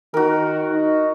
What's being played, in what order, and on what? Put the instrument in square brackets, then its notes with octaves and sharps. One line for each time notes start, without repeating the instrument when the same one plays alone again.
[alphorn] D#3 [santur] F#4 A#4
[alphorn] D#4